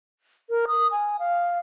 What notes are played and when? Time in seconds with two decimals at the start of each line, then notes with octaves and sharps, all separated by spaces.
0.50 A#4
0.68 D#6
0.91 G#5
1.19 F5